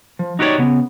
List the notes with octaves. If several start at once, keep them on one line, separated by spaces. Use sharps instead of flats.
F3
D#4 F#4 G4 A4 C#5 D5
C#3 B3